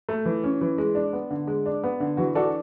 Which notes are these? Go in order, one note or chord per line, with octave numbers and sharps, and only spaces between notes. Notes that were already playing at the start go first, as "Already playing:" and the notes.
A3
E3
C#4
E3
G#3
D4
B3
D3
G#3
D4
B3
D3
E3 F#4
D4 F#4 A4